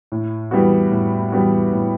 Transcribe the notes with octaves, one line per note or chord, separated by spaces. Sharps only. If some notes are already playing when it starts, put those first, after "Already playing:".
A2
E3 G3 B3 F#4
A2
E3 G3 B3 F#4
A2